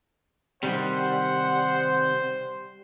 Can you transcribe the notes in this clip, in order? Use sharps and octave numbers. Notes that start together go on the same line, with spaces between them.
C3 D#3 G3 C5 F#5